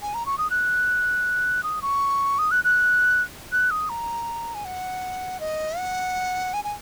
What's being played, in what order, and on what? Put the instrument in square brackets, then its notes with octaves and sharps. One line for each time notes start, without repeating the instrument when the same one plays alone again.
[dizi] G#5
A#5
C#6
D#6
F#6
D#6
C#6
D#6
F#6
F#6
F#6
D#6
A#5
G#5
F#5
D#5
F#5
G#5
G#5